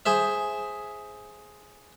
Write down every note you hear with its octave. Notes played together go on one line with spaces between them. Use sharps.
G#4 C5 E5